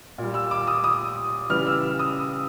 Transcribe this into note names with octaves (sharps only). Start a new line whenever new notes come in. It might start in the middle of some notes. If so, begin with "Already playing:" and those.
A#2 G3
E6
D6
D#6
D#6
C#3 E3 G3 F6
E6
D#6